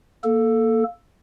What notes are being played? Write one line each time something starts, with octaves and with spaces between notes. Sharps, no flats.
A#3 A4